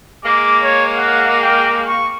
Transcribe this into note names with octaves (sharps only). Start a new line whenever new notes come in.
G#3 A#3 D6
C#5
F#5
G5
C#6